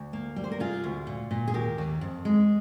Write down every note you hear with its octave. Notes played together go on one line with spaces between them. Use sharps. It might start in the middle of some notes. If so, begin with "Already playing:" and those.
Already playing: D2
A#3
G3
C5
A#4
C3 F4 G#4
D2
A#2
A#2
G#4
D#2 G4 A#4
D#2
F2
G#3